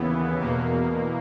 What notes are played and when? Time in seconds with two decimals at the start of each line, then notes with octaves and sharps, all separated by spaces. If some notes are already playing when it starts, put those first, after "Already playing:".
Already playing: D#2 C#3 E3 B3
0.39 E2 B2 A#3